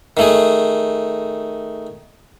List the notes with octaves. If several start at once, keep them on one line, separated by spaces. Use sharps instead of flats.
D#3 A3 G#4